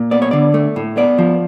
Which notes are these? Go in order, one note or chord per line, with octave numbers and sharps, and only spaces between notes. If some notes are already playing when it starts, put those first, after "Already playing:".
Already playing: A#2
B3 D5
C#5
D3 D5
A3
A2
B3 D5
F3